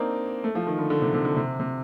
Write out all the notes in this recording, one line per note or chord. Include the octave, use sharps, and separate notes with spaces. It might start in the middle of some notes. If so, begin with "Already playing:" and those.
Already playing: A#3 C4 D4 D#4
A3
F3
D#3
D3
D3
C3
C3
D3
C3
C3